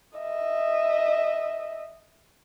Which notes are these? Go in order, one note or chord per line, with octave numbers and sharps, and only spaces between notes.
D#5 E5